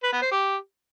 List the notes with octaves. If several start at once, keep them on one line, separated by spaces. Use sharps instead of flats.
B4
B3
C5
G4